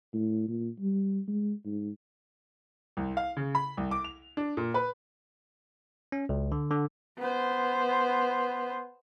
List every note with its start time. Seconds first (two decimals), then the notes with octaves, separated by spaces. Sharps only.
0.14 A2
0.49 A#2
0.80 G3
1.28 G#3
1.65 G#2
2.97 C2
3.17 F5
3.37 C#3
3.55 B5
3.77 C2
3.91 D6
4.04 F7
4.37 D4
4.57 A#2
4.74 B4
6.12 C#4
6.29 C#2
6.52 D3
6.71 D3
7.18 B3 C5